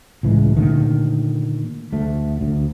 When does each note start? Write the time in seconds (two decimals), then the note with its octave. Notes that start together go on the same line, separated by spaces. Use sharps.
0.23 C#2 A2 E3 G#3
0.56 A#2 D3 D#3 A3
1.93 D2 A3
2.41 D2